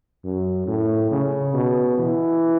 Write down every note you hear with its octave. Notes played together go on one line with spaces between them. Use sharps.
F#2
A2
C#3
B2
E3